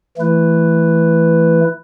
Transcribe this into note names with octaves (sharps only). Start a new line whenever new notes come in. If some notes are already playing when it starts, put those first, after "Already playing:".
E3 A3 E4 B4